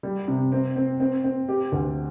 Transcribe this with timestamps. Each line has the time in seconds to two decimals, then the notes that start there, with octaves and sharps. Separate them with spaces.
0.03 G3
0.28 C3
0.52 C4
0.76 C4
1.00 C4
1.24 C4
1.49 G4
1.72 D2